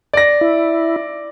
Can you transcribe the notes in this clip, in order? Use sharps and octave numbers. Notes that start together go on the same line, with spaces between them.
D5 A#6
E4